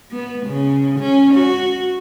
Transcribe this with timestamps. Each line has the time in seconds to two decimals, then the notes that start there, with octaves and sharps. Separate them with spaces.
0.11 B3
0.46 C#3
1.00 C#4
1.34 F#4